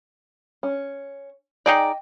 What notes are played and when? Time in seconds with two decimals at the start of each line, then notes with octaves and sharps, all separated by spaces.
0.63 C#4
1.66 D#4 G#4 D5 D#5 G5